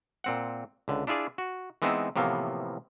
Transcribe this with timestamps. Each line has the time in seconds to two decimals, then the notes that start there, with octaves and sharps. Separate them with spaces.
0.24 A#2 C4 F#5
0.88 C#2 D3
1.07 D4 E4 F4 G#4 D5
1.38 F#4
1.82 E3 G#3 B3 C4 D#4 E4
2.16 A2 C3 E3 F3 A#3 B3